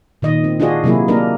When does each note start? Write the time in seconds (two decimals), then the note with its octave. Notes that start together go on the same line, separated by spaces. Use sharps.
0.22 A#2 D#3 D#5
0.44 C4
0.60 D4 F4 F#4 G#4 D#5
0.84 C3 F#3 A#3 E4 G#4
1.08 A#3 D4 A#4 D#5